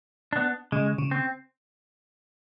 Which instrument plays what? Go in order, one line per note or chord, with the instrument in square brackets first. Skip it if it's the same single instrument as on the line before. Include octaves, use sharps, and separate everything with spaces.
[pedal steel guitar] B3 D4
[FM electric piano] C#3 [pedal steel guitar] G#3
[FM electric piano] C#3
[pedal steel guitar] C4